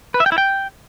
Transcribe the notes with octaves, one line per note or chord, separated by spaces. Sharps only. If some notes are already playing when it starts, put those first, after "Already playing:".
B4
E5
G5
E4
G5